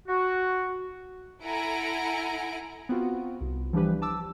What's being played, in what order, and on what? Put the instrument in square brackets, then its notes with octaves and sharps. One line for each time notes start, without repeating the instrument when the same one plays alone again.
[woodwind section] F#4
[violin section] E4 A4 F#5 G#5 A#5 D7
[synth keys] B3 C4 F4 F#4
C2
E3 F3 G3 D4 G4 B4
A5 D6 E6